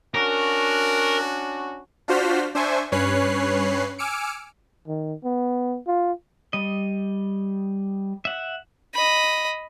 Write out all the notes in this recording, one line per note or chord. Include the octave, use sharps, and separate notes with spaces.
C#4 D4 F#4 A#4
D4 F4 F#4 C5 F6 B6
D4 C5 E5 G#5 C#6
G2 C#4 B4 C#5 F#6 C7
G#5 D6 E6 F6 C#7 D7
D#3
B3
F4
G3 D#5
E5 F#5
D#5 B5